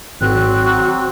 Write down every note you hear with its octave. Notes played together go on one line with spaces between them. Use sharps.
G#1 F#3 C4 F#6